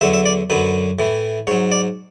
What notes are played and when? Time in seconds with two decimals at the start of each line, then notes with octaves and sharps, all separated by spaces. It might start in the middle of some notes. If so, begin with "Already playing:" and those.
0.01 E2 D3 F#3 E5
0.13 E5
0.26 D5
0.50 F#2 D3 F#3 B4
0.99 A2 E3
1.47 G#2 F#3 C#5
1.72 D5